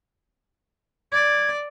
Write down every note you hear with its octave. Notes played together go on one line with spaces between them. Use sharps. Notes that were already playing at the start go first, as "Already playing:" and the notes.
D5 G#6